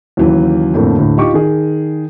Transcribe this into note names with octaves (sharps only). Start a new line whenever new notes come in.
D#2 C#3 E3 F#3
F2 A2 D3 A3 A#3
D2 A2 D3
D#4 F4 G4 C#6 D6
D#3 G#4